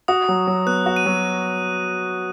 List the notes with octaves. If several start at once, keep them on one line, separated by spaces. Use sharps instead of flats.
F#4 D#6
F#3
F#3
B3 F#6
F#4
D#7
F#3